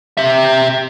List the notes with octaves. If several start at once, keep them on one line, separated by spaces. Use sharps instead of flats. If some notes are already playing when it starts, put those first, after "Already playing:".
G4 E5